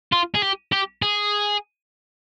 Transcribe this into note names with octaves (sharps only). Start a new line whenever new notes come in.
F4
G#4
G4
G4
G#4